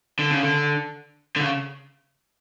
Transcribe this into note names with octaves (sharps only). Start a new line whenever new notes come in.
D3
C#3
D3
D3
C#3